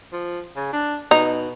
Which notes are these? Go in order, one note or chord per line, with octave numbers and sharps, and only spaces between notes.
F3
C#3
D4
B2 D#4